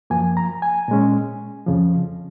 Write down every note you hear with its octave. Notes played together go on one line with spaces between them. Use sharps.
F#2 F3 A#3 G#5
A#5
G#5
A#2 G#3 C#4
F2 C#3 F3